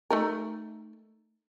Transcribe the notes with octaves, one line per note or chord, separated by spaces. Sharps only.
A3 D#4 A#4